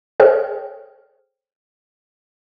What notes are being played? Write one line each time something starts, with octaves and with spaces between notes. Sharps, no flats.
G#4 A4 C5 C#5 G5 F6